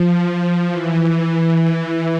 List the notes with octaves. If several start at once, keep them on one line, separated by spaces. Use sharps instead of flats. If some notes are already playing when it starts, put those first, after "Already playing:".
Already playing: F3
E3